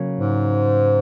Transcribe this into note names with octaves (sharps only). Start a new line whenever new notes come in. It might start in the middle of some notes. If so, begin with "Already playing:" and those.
Already playing: C#3 F#3 A#3
G#2